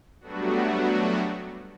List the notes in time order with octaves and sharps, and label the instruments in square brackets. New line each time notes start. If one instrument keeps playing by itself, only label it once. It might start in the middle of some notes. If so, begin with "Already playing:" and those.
[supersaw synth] F#3 G3 A3 B3 D4 F#4